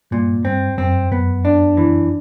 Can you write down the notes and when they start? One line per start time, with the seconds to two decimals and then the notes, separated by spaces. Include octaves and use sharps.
0.11 G2 A#2
0.45 G2 C4
0.78 F#2 C4
1.11 F#2 B3
1.45 D4
1.77 E3